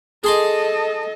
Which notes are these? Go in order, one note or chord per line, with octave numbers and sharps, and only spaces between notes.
G#4 A4 D#5 C6 D6